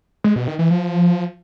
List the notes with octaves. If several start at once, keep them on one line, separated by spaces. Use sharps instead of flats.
G#3
B2
D#3
E3
F3